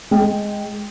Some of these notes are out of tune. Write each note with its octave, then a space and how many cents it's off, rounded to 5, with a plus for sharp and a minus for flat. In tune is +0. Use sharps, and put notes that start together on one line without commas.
G#3 +0 G5 +0